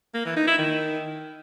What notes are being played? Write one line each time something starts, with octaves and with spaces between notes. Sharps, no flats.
A#3
E3
D#4
E4
D#3